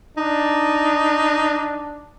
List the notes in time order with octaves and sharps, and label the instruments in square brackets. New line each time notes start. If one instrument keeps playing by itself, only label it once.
[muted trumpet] D4 [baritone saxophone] D#4